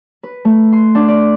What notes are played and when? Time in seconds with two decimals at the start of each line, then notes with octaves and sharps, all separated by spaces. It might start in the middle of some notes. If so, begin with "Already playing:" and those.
0.23 B4
0.45 A3
0.72 C6
0.95 D4
1.08 D5